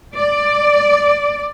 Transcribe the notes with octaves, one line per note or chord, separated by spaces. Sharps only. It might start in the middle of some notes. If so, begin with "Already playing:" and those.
D5